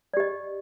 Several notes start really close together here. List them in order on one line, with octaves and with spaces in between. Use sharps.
D5 G4 D#5